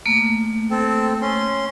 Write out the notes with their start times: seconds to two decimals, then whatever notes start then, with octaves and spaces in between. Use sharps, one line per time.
0.06 A3 A#3
0.70 C4 A4
1.22 C#4 C6